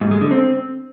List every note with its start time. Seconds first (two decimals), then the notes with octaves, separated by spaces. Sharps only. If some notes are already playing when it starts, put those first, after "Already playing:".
0.01 G#2
0.11 G#3
0.21 D3
0.31 C4